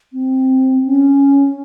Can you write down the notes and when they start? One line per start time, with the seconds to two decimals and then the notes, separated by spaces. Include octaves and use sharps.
0.13 C4
0.86 C#4